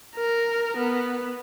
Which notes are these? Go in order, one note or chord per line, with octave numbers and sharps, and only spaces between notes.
A#4
B3